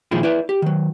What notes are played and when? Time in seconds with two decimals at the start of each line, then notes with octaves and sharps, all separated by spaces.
0.11 A#2 D#3 F3 G#3 E4 F4
0.23 E4 B4 D5 E5
0.49 G4
0.62 D#3 F#3